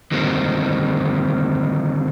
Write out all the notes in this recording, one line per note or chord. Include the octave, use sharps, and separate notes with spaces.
D3 D#3 G3 A#3 C4